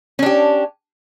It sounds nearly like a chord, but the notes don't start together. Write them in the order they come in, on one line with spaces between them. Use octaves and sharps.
C#4 D4 G4